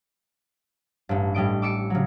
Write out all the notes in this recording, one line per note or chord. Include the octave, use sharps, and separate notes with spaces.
A1 G2
A2 G3 D#5 D7
D6 E6 C#7 D7
C#3 F#3